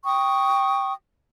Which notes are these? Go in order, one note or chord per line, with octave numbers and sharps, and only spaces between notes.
G5 C#6 D#6